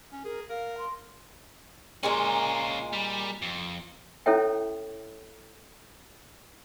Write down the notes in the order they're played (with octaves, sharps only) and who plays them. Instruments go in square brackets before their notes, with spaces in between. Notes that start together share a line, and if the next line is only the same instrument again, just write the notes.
[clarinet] C#4
[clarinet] G#4 [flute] A#4
[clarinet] A#4 [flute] F5
[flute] C6
[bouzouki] A#2 G#3 A#3 [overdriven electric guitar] C#4 F4
[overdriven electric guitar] G3
F2
[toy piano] C#4 E4 A4 C#5 E5 G5